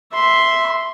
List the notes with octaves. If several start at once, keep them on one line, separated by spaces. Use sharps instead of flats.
E5 C6